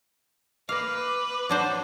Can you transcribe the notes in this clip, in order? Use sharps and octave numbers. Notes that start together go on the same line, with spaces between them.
A#3 B4 F5 D6
F#3 D4 C5